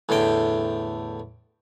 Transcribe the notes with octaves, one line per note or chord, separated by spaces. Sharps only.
E2 A2 D3 G5